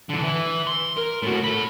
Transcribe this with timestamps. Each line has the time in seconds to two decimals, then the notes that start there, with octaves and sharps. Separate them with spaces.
0.10 D3 E3
0.23 E3
0.67 C6
0.97 A#4
1.23 A2 F#4
1.44 A4 B5